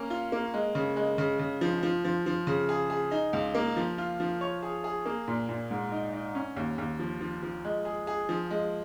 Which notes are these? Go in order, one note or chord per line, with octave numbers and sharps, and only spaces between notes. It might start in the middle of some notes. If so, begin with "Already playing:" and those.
Already playing: A#3 C#4
F4
A#3
G#3
C#3
G#3
C#3
C#3
F3
F3
F3
F3
C#3
G#4
G#4
D#4
C#2
A#3
F3
F4
F3
C#5
G#4
G#4
A#3
A#2
A#2
G#2
D#4
D#4
C#4
D#2
D#2
F3
F3
F3
G#3
G#4
G#4
F3
G#3